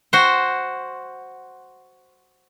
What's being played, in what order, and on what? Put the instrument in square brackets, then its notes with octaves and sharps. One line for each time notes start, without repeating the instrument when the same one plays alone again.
[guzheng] F#4 C5